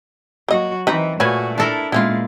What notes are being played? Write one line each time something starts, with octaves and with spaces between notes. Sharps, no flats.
F#3 A#3 F#4 D#5
D#3 E3 C4 D#4 B4
A#2 A3 F#4 B4 C#5 G#5
D4 E4 A4 A#4
A#2 G#3 B3 C#4 E4 F4